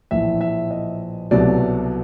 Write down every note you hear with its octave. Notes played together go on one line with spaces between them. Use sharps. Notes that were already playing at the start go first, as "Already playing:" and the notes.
A#1 A2 E3 E5
E5
D#5
C2 B2 F#3 A3 D5